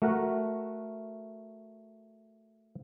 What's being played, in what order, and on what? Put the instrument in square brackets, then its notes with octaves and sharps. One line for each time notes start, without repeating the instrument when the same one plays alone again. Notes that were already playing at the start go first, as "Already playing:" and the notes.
[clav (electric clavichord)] A3 F#4 A#4 F#5